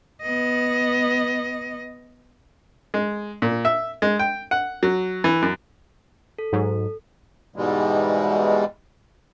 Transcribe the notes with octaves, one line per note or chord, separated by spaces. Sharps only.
B3 D#5
G#3
A#2
E5
G#3
G5
F#5
F#3
E3
F#2
A4
G#2 F#3
G#2 B2 E3 G3 G#3